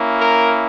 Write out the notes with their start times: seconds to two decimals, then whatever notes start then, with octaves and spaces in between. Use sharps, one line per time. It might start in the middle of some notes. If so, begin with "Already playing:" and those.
Already playing: A#3 C#4 E4
0.19 A#4